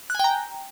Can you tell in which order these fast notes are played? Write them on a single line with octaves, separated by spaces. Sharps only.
F#6 G#5 G5 A#5